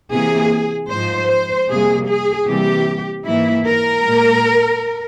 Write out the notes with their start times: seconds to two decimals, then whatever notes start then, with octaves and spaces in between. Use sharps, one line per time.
0.11 C3 E3 A#3 G#4
0.89 G#2 F3 G#3 C5
1.28 C5
1.68 F2 C3 G3 A#3 G#4
2.07 G#4
2.47 C3 E3 G3 A#3 G4
3.25 G#2 E3 A#3 E4
3.66 A#4
4.04 A#2 G#3